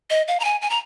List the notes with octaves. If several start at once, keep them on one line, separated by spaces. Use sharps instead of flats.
D#5
F5
A#5
G#5
G#5
A#5